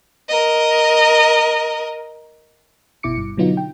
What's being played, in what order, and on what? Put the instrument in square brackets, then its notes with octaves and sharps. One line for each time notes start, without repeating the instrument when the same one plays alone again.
[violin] A#4 D#5
[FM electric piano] G1 B2 E4 D6 C#7
G2
B2 D3 F#3 B3 D#4 F4
G5